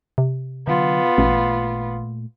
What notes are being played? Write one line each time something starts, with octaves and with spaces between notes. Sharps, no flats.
C3
D3 F#3 B3 F4
A1 A#2 A3